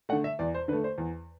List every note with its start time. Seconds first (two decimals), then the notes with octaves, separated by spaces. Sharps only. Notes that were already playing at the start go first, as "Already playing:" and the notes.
0.09 A3 F#5
0.12 D3
0.24 E5
0.39 E2 D5
0.54 C5
0.68 D3 B4
0.73 A3
0.84 C5
0.98 E2